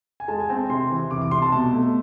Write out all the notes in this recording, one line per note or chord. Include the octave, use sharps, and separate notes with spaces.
G#5
G#3 A5
G#5
C4 A5
C3 C6
E3
C2 D6
D6
C3 C6
A5
B2 A5
A3